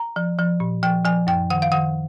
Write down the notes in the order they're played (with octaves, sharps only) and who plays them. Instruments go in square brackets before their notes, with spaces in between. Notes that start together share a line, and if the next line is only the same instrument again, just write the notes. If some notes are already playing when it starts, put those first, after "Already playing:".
Already playing: [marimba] A#5
F3
F3
A#2
F3 G5
F3 G#5
F#2 G5
D#3 F#5
F5
D#3 F#5